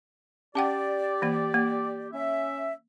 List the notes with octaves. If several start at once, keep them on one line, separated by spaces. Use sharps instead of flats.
C#4 G4 D5 F#5 G5
E3 A#3
A#3
C#4 E5